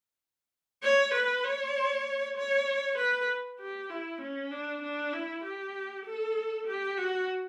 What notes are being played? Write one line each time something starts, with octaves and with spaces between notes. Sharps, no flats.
C#5
B4
C#5
C#5
B4
G4
E4
C#4
D4
D4
E4
G4
A4
G4
F#4